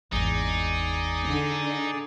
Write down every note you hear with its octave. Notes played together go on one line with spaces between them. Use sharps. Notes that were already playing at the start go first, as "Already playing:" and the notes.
G#1 E2 D#4 G#4 D5 D#6
D3